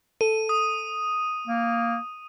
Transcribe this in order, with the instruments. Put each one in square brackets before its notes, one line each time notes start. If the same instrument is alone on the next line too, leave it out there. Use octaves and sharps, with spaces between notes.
[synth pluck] A4 [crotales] D#7
[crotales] D#6
[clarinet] A#3